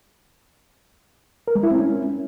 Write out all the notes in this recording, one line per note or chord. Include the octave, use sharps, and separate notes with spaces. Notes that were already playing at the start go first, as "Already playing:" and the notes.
A#4
G#3
E4
C4
C#4